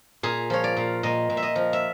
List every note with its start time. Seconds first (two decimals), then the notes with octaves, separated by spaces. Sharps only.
0.23 A#2 G#4
0.50 F3 C#5
0.64 D5
0.77 A#2
1.03 A#2 D#5
1.30 A#2
1.37 E5
1.43 D#5
1.56 F3
1.73 E5